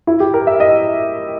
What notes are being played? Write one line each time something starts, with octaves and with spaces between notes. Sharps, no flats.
E4
G4
A#4
E5
D#5